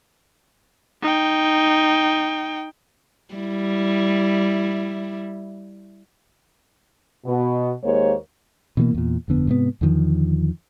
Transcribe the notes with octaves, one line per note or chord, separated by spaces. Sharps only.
D#4 G5
G3 E4
B2
D#2 G#3 A#3 C5 C#5
B2 E3 G3 A#3
E2 A#2
G1 F2 D3 B3
G#2 C3 B3
E2 D3 D#3 F3